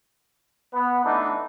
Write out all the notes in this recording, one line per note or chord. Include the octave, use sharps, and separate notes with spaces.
B3
E3 A3 B3 D4 D#4